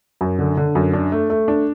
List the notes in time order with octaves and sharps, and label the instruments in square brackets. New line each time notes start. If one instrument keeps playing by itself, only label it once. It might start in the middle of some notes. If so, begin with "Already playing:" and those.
[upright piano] F#2
D3
D3
F#2
D4
A3
A3
D4